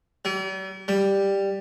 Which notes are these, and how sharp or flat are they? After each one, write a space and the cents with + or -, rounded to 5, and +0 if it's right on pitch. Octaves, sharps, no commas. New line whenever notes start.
G3 -45
G3 +5